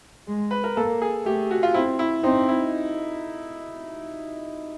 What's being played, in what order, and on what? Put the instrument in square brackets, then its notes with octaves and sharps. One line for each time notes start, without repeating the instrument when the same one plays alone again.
[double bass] G#3
[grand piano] B4
A#4
[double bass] A#3 [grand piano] A4
[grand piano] G#4
[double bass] A3 [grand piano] G4
[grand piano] F#4
F4
[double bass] C4 [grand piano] E4
[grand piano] E4
[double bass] C4 [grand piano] D#4
[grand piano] E4